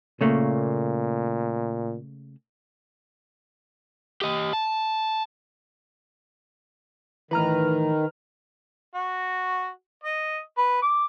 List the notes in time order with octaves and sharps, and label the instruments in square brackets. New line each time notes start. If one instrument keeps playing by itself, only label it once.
[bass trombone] A#2 [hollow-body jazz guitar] C#3 A3 A#3
[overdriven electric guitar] G4 D#5
A5
[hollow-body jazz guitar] A2 E3 [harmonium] D#3 [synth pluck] B4 A#5 F6
[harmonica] F#4
D#5
B4
D6